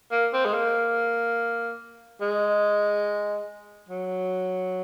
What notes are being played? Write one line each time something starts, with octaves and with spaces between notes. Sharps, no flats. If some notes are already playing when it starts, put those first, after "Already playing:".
A#3
C4
G#3
A#3
G#3
F#3